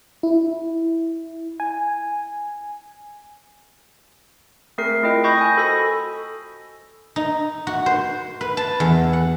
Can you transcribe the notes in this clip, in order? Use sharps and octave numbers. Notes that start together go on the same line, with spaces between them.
E4
G#5
A3 C4 G#4 A#4 C7
A3 E4 F4 D#5 G5
D#5 B5 C#6 D#6 G6 A#6
G#5 B5 D#6
F#4 A4 C5 B5 E6 A#6
D#4
F#4
C5
B4
A5
E2
F#5